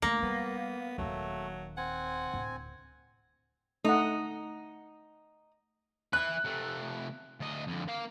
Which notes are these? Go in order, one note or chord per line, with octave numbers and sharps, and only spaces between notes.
A3 A#3 D4
G3 B3
D#1 D#3 F#3 A3
C4 F#5 G#5
D1
A3 D#4 F#5
E4 B4 F#6
C3 A3
D2 D#5
F2 D3
A#3 F5